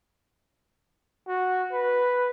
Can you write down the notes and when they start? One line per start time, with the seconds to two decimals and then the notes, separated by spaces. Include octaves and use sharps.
1.28 F#4
1.72 B4